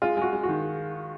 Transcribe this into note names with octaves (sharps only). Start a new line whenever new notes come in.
G#3 F4
G#3 F#4
G#3
F#4
D#3